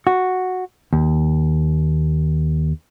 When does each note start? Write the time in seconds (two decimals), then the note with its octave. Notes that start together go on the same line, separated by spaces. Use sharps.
0.07 F#4
0.93 D#2